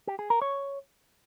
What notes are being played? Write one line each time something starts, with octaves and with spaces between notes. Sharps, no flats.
G4
G#4
A#4
C#5